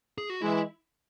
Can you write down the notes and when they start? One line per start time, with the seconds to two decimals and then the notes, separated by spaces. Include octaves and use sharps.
0.18 G#4
0.30 F#4
0.42 E3 G#3 E4